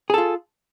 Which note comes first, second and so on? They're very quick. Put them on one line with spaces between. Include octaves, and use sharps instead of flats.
G#4 A4 F4